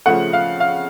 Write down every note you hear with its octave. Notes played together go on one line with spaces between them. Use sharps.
C#3 F3 A3 F#5
F5
F5